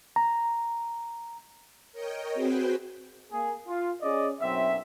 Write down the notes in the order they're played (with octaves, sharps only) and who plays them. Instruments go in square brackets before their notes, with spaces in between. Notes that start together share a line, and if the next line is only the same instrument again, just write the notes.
[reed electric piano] A#5
[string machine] A#4 C#5 D#5 G5
C4 F#4 G#4 B4 C5 G5
[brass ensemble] A#3 G#4
F4
C#4 G#4 D5 D#5
B1 F#2 C4 E5